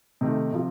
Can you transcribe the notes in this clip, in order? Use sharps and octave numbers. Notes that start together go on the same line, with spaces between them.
C3 D#3 A3
C3 F3